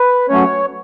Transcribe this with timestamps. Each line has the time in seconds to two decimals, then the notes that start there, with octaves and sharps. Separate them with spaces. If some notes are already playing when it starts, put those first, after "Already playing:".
Already playing: B4
0.29 F#3 A3 C#4 C#5